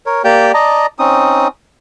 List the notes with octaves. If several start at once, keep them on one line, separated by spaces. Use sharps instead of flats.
A#4 C#5
A#3 G4 D5 G5
D5 D#5 A5 A#5
C4 C#4 D#4 D#6